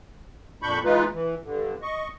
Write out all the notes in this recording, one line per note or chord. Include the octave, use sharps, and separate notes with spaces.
F2 A#2 D4 B5 C#6 G6
E3 G#3 D#4 F4 B4
E3
G2 D3
D#5 C#6